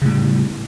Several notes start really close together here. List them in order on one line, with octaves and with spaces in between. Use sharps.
C#3 A2 G3